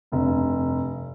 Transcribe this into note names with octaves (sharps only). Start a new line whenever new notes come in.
F1 G2